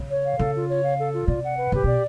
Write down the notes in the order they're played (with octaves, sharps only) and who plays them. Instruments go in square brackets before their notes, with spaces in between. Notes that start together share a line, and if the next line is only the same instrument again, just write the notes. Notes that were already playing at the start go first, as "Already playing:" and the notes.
Already playing: [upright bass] C#3
[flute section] C#5
F5
[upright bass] C#3 [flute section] A4
[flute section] F4
C#5
F5
A4
F4
[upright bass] C3 [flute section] D5
[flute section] F#5
B4
[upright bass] C#3 [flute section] G4
[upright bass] B2 [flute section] D5